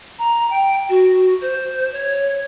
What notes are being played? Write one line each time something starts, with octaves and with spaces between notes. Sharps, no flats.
A#5
G5
F#4
C5
C#5